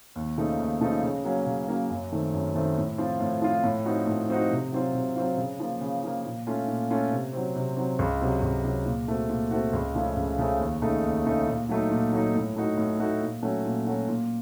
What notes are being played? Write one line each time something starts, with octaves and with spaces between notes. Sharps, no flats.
D#2
C#3 F3 A3 D#4
D#2
C#3 F3 A3 D#4
C#3
F#3 A#3 C#4
C#3
F#3 A#3 C#4
F#2
D#3 A3 C4
F#2
D#3 A3 C4
A2
F3 C4 F4
A2
F3 C4 F4
A2
F3 C4 D#4 F#4
A2
F3 C4 D#4 F#4
C3
F#3 C4 F4
C3
F#3 C4 F4
C#3
F3 A#3
C#3
F3 A#3
A#2
A3 C#4 F4
A#2
A3 C#4 F4
C3
F#3 C4
C3
F#3 C4
C#2
C3 F#3
C#2
C3 F#3
A#2
A3 C4 F#4
A#2
A3 C4 F#4
C#2
C#3 F3 A3 C#4
C#2
C#3 F3 A3 C#4
D#2
C#3 A3 D#4
D#2
C#3 A3 D#4
A#2
F#3 A3 D#4
A#2
F#3 A3 D#4
A2
A3 D#4 F#4
A2
A3 D#4 F#4
A#2
F#3 A3 C#4 F#4
A#2
F#3 A3 C#4 F#4
A#2